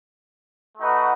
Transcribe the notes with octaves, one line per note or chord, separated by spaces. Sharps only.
A3 D#4 F#4 B4